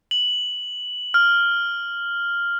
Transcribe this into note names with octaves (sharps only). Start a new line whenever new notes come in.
F#7
F6